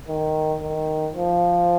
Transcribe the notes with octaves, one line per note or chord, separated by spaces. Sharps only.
D#3
D#3
F3